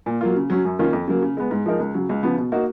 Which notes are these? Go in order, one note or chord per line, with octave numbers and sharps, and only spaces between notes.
A#2
F#3 A#3 F4
C#3
F#3 C#4
F#2
D#3 A#3 C#4 F4
F2
C#3 F#3 A#3
C#3
G#3 B3
G#2
F3 G#3 D#4 A#4
C#2
C#3 F#3
C#2
C#3 F3 B3
B2
A#3 D#4 F#4